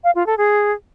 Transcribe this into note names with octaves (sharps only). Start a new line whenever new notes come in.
F5
F4
A4
G#4